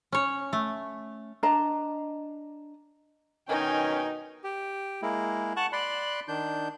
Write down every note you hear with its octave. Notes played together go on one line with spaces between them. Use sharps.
C#4 C#5
A3
D4 D#5 A5 A#5
B2 D#3 C#4 D#4 G5 G#5
G4
G#3 A#3 E4
F#5 A5 C#6 F#6
D5 B5 C6 F#6
D#3 D4 G6